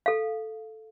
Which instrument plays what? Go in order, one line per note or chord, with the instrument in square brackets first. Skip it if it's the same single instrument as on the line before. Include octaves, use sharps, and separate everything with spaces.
[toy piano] A4 F5